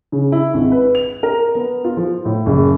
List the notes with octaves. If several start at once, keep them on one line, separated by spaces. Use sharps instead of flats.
C#3
E4
G#1
B4
F7
A#4
B3
F4
F3
A2
F#1